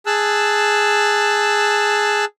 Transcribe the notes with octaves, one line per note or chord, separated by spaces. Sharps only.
G#4 A5 E6 F#6